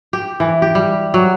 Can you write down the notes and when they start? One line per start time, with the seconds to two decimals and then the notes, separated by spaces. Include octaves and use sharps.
0.13 G4
0.40 E3
0.62 G4
0.75 G3
1.14 F#3